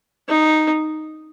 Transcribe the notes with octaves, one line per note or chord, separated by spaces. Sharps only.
D#4